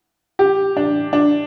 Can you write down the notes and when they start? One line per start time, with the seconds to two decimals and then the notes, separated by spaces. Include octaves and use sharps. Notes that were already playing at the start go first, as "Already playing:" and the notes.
0.39 G4
0.77 D4
1.13 D4